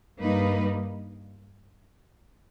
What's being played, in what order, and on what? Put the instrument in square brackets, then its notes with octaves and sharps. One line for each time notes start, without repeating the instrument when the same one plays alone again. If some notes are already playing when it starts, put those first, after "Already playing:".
[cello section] G2 G3 A#3 D#4 B4